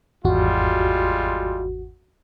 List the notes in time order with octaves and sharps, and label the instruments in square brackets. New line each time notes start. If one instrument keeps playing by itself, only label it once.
[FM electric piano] G#1 E2 F#4 [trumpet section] G3 G#3 F4